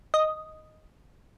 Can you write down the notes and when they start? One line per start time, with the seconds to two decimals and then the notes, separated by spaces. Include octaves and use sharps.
0.14 D#5